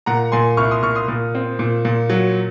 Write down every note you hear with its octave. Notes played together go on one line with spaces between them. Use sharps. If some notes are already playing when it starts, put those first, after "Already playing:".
A#2 F#5 A#5
A#2 G#5 C6
C2 C#6 F6
C6 D#6
A#2 C#6 F6
C6 D#6
A#2
C4
A#2
A#2
F#3